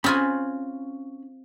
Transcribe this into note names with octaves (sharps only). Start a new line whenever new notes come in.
C4 C#4 F4 G#5 B5